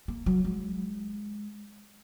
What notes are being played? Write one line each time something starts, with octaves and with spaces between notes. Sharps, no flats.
A#3
F#3
G#3